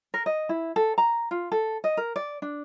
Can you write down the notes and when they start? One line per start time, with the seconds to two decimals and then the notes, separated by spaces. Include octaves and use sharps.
0.14 A#4
0.26 D#5
0.49 E4
0.76 A4
0.98 A#5
1.31 F4
1.52 A4
1.84 D#5
1.97 A#4
2.16 D5
2.42 D4